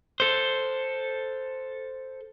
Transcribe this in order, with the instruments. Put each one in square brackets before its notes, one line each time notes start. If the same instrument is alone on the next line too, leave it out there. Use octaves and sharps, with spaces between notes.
[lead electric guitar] A4 C5